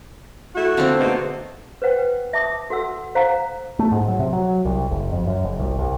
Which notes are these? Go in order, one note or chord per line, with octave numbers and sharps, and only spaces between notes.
A3 E4 F#4
D3 A#3 C4
G#2 B2 A3
B4 C5 F#5 G5
E5 A5 D6 D#6
F#4 A4 F#5 E6
C5 F5 F#5 A#5
A3
G#2
F#3
C3
F#3
C2
F#1
F2
F#2
F#1
C2
C2